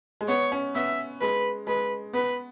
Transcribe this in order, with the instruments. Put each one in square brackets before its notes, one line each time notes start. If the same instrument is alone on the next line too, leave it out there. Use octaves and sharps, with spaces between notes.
[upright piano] G#3
[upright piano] B3 [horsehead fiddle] C#5
[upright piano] C#4
[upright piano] B3 [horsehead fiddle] E5
[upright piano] G#3 [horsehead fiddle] B4
[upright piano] G#3 [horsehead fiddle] B4
[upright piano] B3 [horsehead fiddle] B4